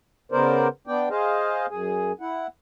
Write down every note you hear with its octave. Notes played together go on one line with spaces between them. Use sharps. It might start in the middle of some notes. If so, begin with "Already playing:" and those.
C#3 B3 A#4 C5 D5
B3 D4 D5 G5
G#4 C5 D#5 F5
F#2 G#4
E4 F#5